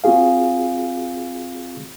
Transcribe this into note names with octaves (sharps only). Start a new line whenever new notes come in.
C4 F4 F#4 G#4 F5